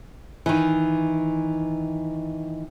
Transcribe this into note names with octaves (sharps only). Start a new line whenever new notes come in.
D#3 E3